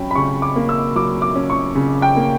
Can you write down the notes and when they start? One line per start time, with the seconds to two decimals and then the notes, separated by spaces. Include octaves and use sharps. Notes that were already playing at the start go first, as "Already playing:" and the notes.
Already playing: F#3 C#4 G5 B5
0.11 B5
0.15 C#3 C#6
0.42 D6
0.56 A#3
0.69 E6
0.96 F#3 D6
1.22 D6
1.36 C#4
1.50 C#6
1.75 C#3
2.02 G5
2.17 A#3